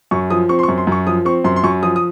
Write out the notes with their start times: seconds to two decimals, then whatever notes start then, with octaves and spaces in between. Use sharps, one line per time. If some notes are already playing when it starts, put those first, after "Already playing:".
0.11 F#2 C#6
0.30 F3 D#6
0.49 C4 C#6
0.59 C6
0.63 C#6
0.69 F#2
0.78 C6
0.87 F#2 C#6
1.07 F3 D#6
1.25 C4 C#6
1.44 F#2 C6
1.56 C6
1.64 F#2 C#6
1.83 F3 D#6
1.96 D#6